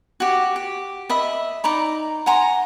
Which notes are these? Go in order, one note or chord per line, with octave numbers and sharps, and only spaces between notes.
F#4 G4
G4
D#5 E5 B5
D#4 D5 A#5 B5
F#5 G#5 A#5 C6